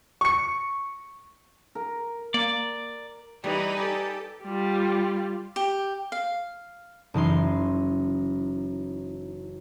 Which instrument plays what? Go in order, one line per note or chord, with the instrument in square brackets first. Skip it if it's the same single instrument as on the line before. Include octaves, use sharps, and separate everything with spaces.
[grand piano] C#6 C#7
[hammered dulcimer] A#4
[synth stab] A#3 [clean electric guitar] D5
[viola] E3 [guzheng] G3 [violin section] D#4 B4
[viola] G4 A4 [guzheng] D5 G5 G#5
[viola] G3 F4
[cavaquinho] G4
F5
[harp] F#1 E3 D#4 C6